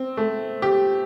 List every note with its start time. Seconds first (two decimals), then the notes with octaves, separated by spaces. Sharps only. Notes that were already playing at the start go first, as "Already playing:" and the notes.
Already playing: C4
0.17 A3
0.62 G4